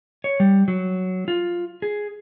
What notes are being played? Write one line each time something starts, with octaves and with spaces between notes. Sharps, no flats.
C#5
G3
F#3
F4
G#4